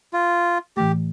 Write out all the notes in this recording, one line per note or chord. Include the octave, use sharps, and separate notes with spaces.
F4
A2 E3 A3 G4